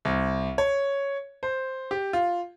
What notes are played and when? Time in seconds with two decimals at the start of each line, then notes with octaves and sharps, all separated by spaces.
0.05 C2
0.58 C#5
1.43 C5
1.91 G4
2.13 F4